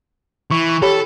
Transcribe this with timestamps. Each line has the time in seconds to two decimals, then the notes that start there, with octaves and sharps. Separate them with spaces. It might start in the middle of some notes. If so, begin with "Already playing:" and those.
0.51 E3 C#6
0.82 G4 A4 C#5 B5